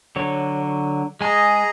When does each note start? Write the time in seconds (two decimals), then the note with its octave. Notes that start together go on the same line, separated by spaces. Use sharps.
0.16 D3 F#3 C#5
1.21 G#3 G#4 D#5 G#5 A#5